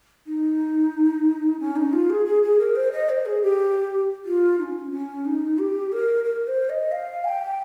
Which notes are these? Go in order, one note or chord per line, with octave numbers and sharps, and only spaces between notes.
D#4
C#4
D#4
F4
G#4
G#4
G#4
A#4
C5
D#5
C5
G#4
G4
F4
D#4
C#4
C#4
D#4
G4
A#4
A#4
C5
D#5
F5
G#5
G5